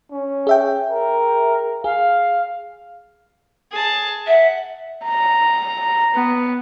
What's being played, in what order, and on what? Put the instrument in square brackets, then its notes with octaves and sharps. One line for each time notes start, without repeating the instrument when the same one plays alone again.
[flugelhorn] C#4
[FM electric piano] G#4 E5 G5
[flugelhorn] A#4
[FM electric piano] G#4 [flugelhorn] F5
[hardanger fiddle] G#4 A5
[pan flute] E5 [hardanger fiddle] F#5
[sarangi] A#5
B3